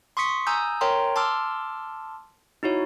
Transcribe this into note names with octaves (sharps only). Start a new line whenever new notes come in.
C6 C#6 D#6 B6 C#7
G#5 A#5 D#6 E6 G6
A#4 C#5 G5 A#5 C6
A5 C6 D6 E6 F6
D#4 E4 F#4 C#5